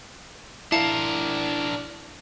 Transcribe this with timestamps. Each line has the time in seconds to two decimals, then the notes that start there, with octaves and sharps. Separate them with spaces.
0.72 D4 E4 A#4 F5 A5 C#7